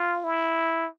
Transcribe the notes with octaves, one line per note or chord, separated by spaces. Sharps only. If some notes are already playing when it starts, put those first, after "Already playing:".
Already playing: F4
E4